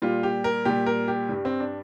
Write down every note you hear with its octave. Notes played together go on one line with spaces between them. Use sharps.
A#2 G3 F4
G4
A#4
A#2 G3 G4
A#4
G4
G2 G3
C4
D4